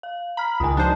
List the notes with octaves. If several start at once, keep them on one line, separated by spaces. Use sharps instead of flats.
F5
A#5 B5 F6
C#2 D#3 G#5 D#6
F3 D4 D#4 F#4 C5